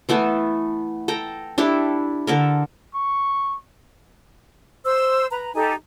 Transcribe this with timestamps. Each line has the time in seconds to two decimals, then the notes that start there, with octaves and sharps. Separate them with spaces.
0.09 E3 A3 B3 A4
1.08 A4 G5 A#5
1.58 D4 E4 G4 A4
2.27 D3 A4 A#4
2.94 C#6
4.84 C5 E6
5.30 B4 A#5
5.54 D#4 G4 A4 G#5